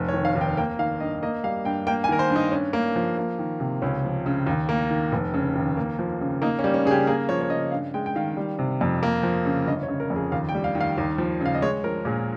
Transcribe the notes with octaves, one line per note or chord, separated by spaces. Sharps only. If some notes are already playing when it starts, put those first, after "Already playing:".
Already playing: F1
C#5
D#3
F5
D#2
G5
A#3 G5
D#3 F5
G2 D#5
A#3 D#5
G3 F5
G2 G5
A#3 G5
G#5
D#3 A#4
C5
G2
D#4
G2 C#4
A#3
F3
A#3
D#3
C3
C#2 C#4
F3
C#3
D#2
A#3
D#3
F1
C#3
D#2
A#3
F3
C#3
A#3 D#4
C#4
G3
C#4
C#3 G#4
G4
A#3 G#4
F3 C#5
C#5
C#3 D#5
G2 F5
G#3 G5
G5
D#3 F5
G3
C3
F2
A#3
F3
C#3
G1 D#5
C#5
C#3
A#4
F2
G#4
D#2 F5
G5
G3
F5
D#3
F5
D#2
F3
C#3 F5
D#5
G#3 C#5
F3 A#4
A#2 G#4